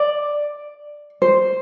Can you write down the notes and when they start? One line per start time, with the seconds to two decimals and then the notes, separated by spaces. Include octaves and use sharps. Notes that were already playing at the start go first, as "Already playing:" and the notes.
Already playing: D5
1.22 C5